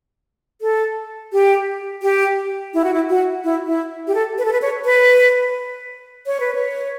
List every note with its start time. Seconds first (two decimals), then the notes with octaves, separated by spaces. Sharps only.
0.61 A4
1.33 G4
2.03 G4
2.74 E4
2.84 F#4
2.94 E4
3.10 F#4
3.44 E4
3.66 E4
4.07 G4
4.15 A4
4.38 B4
4.45 A4
4.53 B4
4.62 C#5
4.85 B4
6.27 C#5
6.40 B4
6.55 C#5